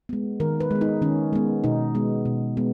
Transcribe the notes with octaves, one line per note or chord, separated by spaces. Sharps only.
G#3 B3
D#3 A#4
B4
G#3 B3
D#4
D#3 C#4
G#3 B3
B2 D#4
G#3 B3
B2
G#3 B3